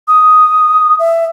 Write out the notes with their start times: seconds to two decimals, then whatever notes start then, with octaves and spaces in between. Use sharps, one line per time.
0.08 D#6
0.99 E5